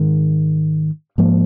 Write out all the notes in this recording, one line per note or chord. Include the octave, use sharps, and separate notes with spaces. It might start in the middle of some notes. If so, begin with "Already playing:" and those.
Already playing: G#2 D#3 G#3
G#2 F3 A#3